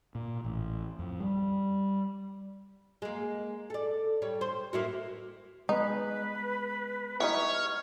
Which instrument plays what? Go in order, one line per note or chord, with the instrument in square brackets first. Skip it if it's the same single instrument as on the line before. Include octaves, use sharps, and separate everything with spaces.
[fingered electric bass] A#2
A1
F2
G3
[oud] G#3 A#3
A4 D5
G3 C#5
C5
A#3 E4 F#4
[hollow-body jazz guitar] G#3 B3 [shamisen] D#4 [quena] B4
[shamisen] E3 G3 D#4 [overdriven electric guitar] C#5 [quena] F6